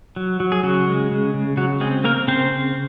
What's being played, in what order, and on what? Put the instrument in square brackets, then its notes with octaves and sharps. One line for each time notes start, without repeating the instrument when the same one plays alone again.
[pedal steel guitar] F#3
F#3
G#4
C#3 F#3 F#4
G#3
C#3
C#3
C#3 F#3 F#4
G#3 C4 G#4
A#3 C4 A#4
C#3 C4 C5
C4